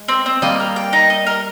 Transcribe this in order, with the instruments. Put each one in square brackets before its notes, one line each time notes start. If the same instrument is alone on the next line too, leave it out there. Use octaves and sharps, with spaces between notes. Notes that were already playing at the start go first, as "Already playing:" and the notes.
Already playing: [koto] G#3
[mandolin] C4
C4
[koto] G3 A#3 [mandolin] D#5
[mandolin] A#4
G5
D#4
D#5
A#4